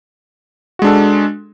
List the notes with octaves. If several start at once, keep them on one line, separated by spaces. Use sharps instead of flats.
G#3 D4 F#4 A4